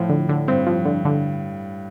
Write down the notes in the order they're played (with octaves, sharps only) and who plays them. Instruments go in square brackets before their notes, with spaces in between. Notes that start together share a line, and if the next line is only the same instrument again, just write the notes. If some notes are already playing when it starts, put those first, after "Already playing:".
Already playing: [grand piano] A2 [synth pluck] F3
[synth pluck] D3
D3
[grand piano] G2 [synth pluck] C4
[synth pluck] F3
D3
D3